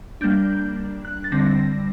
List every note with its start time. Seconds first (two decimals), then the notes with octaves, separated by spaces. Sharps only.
0.21 G3 A#3 D4 G6
1.05 F#6
1.24 A6
1.32 D3 G3 C4 A#6